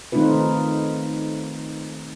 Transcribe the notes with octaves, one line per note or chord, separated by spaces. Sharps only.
D#3 A3 C4 D#4 F4 B4